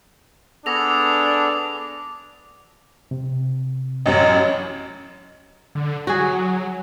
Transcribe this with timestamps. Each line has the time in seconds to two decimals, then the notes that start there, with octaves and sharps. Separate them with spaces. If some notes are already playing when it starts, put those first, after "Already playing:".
0.66 B3 D4 G#4 A4 D6 A#6 F7
3.11 C3
4.06 A1 F#2 F#3 D#5
5.75 D3
6.07 F#3 F#4 G#4